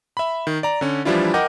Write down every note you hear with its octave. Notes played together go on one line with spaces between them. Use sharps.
E5 B5
D#3
D5 A#5
D3 C#4
E3 F3 G3 D4 E4 F4
A#4 D#5 F#5 G5 D6 G6